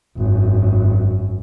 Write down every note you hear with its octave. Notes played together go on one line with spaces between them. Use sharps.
G#1 F#2